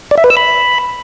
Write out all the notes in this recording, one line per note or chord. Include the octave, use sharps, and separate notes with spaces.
D5
E5
B4
E6
B5